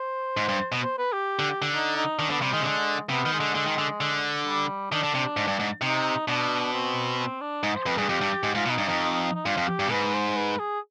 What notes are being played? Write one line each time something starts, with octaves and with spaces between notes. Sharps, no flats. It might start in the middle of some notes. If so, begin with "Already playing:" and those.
Already playing: C5
G#2
G2
B2
C5
B4
G4
D3
D3
D#4
D#4
D#3 D4
D3 B3
C3 G3
D#3 G#3
C3
D3
C3 B3
D#3
G#3
D3
D3
D#3
D3
D3
G3
D#3 D4
D3
C3
G#2
G2
G#2
C3 D#4
B2 D4
C4
C4
D4
G#2 D#4
C5
F2 B4
G2 G#4
F2 G4
G2
G#2
G#2 F4
B2
D#4
G2
F2 D#4
D#4
G2 F4
F2
G4
G2
B2
G#2 B4
C5
B4
G#4